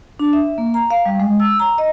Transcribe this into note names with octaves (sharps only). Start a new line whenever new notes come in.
D4
E5
A#3
A#5
F5
G3
G#3
E6
A#5
D#5